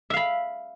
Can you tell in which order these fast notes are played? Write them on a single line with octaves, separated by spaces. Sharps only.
E5 F5 B5